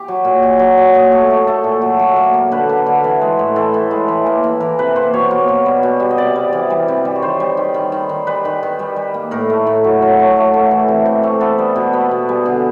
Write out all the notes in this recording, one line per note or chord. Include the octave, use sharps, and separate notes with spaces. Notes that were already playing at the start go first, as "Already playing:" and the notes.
Already playing: G4
F#3
A#2
A#2
F#3
A#2
A#2 G#4
A3
A3
A3 A4
A#2
F#3
F#3
A#3
A#3
D3 B4
A#3
D3
E3
G#3
A2
E3 A4
A2
G#3
E3
A#3
E3
E3 A#4
C3 B4
A#3 C5
B2 C#5
A#3
B2
G3
B2
G3
D#5
C3 D5
G3
E3
G3
C3
G3
C#5
D#3 C5
G3
D#3
D#3
D#3
D#3
G3 B4
D#3
D#3
G3
G3
A#3
A2 A#4
A3
A2
F#3
F#3
A3
A3
A3
E3
C3
C3
A3
B3 A4
G3
B2
B3
B2
G3
D3 G#4